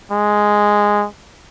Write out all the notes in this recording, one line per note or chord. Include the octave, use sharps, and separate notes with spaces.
G#3